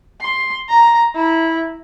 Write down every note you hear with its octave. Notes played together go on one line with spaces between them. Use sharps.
C6
A#5
E4